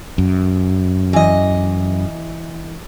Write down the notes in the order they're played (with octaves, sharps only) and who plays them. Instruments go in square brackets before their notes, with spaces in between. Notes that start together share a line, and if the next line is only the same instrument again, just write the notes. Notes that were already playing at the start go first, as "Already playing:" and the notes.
[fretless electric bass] F#2
[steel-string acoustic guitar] E3 D#5